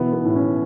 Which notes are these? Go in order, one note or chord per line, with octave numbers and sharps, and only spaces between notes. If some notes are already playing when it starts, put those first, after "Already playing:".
Already playing: B2 E3 B3
B3
A2
C#4